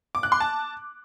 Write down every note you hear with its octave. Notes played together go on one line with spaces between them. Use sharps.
D6
F#6
C6
A5